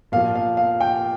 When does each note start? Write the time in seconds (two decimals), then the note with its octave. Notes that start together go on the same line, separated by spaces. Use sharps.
0.12 A#2 F5
0.16 F3
0.35 F5
0.57 F5
0.81 G5